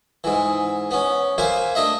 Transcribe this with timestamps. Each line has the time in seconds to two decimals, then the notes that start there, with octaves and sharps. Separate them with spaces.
0.24 G#2 E3
0.91 B3 C#4
1.38 A#3 C5 E5 F5 G#5
1.75 A3 D4 D#5 E5